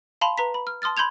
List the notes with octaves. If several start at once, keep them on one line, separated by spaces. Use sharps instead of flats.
F5 A5 B5 C6 F7
B4 A#5 B6
B5
F6
A5 C6 D#6 F6 A6
B5 C6 G6 G#6 F7